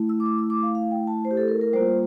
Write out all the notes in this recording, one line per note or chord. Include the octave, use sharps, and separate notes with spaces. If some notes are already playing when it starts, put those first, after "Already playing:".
Already playing: A3 E4
E6
D6
E6
E6
D6
F5
F5
G5
A5
C5
G4
A4
A#4
A#4
G3 A#3 F4 C5